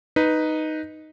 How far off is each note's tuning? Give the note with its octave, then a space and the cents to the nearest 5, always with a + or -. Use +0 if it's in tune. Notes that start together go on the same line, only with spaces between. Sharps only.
D#4 +0 B4 +0